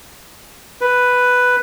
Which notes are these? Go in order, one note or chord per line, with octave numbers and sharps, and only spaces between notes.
B4